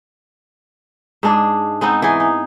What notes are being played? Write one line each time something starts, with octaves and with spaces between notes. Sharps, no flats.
G#2 G#3 D4 G#4
G#3 B3 C4 D#4
E3 D#4 G#4
D#4